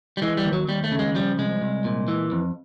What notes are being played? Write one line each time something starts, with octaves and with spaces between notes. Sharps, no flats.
G3
E3 G#3
G3
D#2
F#3
D#2 G3
A3
C#3
G#3
F3 G3
C2 G#3
C2
A#2
E3
F2